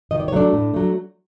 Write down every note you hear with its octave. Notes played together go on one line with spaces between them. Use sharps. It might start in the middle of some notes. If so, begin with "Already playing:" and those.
D#3 D#5
D5
C#5
F#3 A3 D4 D5
A2
F#3 A3